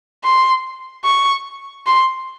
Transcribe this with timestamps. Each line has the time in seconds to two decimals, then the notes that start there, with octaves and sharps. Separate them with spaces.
0.24 C6
1.04 C#6
1.86 C6